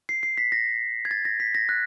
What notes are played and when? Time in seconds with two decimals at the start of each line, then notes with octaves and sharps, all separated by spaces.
0.09 C7
0.23 C7
0.38 B6
0.52 A#6
1.05 G#6
1.11 A6
1.25 A#6
1.40 B6
1.55 A#6
1.69 F#6